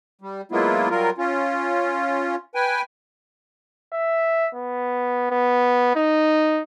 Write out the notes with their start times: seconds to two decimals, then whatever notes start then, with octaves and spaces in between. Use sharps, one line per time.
0.21 G3
0.52 F#3 G#3 A#3 B3 E4 F4
0.90 F#3 G3 F4 A#4
1.18 C#4 F4
2.55 B4 G5 G#5
3.93 E5
4.55 B3
5.31 B3
5.96 D#4